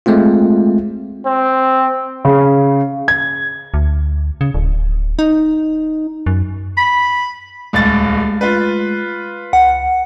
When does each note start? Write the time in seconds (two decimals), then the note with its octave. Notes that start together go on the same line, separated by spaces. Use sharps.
0.06 G#3 A3 C4 F4
1.26 C4
2.25 C#3
3.08 G#6
3.74 D2
4.41 C#3
4.54 D1
5.19 D#4
6.26 F#2
6.77 B5
7.73 D#1 C#2 G#3 A3 A6
8.41 F4 B4
9.53 C#2 F#5